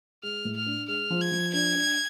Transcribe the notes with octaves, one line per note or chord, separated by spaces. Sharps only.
G#3 F6
A2
F6
D4
G#3 F6
F3
G#6
F3
D4 G#6
D4